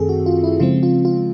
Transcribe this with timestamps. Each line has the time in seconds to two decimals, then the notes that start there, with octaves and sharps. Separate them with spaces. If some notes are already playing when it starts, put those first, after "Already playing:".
Already playing: F#2 D#3 A3 C4 G#4 A4
0.09 F#4
0.26 F4
0.44 E4
0.60 C#3 F3 G#3 C4 F4
0.83 F4
1.05 F4